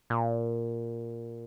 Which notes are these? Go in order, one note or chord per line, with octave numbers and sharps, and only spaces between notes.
A#2